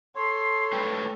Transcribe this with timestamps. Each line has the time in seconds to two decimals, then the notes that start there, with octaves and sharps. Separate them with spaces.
0.15 A4 C#5 C6
0.73 A2 B4 G5